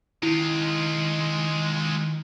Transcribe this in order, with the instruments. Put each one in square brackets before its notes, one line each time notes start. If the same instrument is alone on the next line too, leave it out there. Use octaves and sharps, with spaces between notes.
[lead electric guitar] D#3 [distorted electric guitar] G#3 F4 [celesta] E4